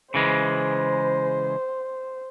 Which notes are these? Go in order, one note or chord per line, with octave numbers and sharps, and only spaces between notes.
C#3 E3 G#3 C5